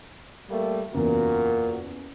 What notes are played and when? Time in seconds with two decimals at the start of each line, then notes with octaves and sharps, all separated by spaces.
0.49 G3 A3 A#3
0.94 F#1 E2 A#2 F#4 A#4